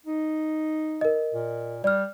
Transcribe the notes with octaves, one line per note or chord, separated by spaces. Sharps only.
D#4
A#4 D#5
A#2
G3 D5 F6